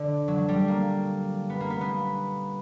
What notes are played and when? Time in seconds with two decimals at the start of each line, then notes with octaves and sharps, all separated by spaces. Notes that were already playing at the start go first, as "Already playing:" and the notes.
Already playing: D3
0.28 F#3
0.38 F#3
0.48 G3
0.68 A#3
1.50 B3
1.60 A#3
1.70 B3
1.81 B3